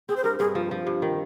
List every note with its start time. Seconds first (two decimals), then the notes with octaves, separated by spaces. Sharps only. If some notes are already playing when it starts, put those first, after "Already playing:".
0.09 C4 G#4
0.17 C5
0.24 G2 A#4
0.39 G2 G#4
0.55 F3
0.71 F3
0.87 G2
1.02 D#3